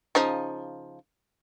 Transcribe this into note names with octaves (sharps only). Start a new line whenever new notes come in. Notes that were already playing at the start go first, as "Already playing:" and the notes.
C#3 F3 D#4